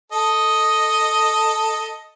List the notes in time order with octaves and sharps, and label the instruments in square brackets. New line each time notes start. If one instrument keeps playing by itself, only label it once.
[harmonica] A4 D#5